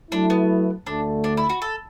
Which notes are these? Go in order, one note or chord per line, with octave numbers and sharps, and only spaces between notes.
F#3 A3 D4 E4
B3
D2 D3 A3 D4
D4
E4
F#4
A4